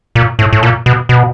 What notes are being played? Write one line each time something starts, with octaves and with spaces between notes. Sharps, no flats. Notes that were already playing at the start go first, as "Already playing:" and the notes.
A#2
A2
A2
A#2
B2
B2